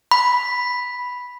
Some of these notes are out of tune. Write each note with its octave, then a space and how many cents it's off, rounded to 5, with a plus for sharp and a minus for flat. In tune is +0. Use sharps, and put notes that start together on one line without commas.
B5 -5